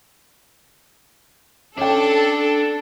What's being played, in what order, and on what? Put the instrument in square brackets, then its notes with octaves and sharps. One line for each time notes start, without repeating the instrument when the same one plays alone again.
[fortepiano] C#4 G5 [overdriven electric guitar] D4 [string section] A4